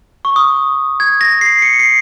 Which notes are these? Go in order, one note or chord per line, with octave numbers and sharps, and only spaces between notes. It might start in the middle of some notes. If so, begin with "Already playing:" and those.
C#6
D#6
G#6
A#6
C7
C#7
C7